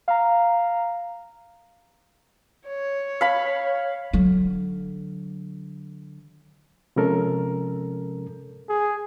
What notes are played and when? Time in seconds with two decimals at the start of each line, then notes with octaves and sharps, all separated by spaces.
0.08 F5 A#5
2.67 C#5
3.21 F5 B5
4.13 D3 F#3
6.96 C3 F3 G#3 C#4 A4 A#4
8.69 G#4